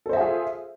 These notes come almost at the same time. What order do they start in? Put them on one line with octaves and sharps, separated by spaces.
A4 C5 E5 G#4 F4